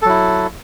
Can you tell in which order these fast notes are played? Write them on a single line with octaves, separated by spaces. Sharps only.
A4 F#3 E4